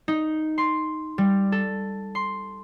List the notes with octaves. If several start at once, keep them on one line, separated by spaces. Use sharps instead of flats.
D#4
C6
G3
A4
C6